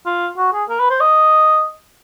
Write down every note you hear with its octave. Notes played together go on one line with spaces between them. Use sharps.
F4
F#4
G#4
A#4
B4
C5
D#5